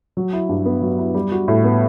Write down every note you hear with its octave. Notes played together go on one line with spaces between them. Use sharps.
F#3
E4
G2
B3
F#3
E4
G3
F#4
A2
B3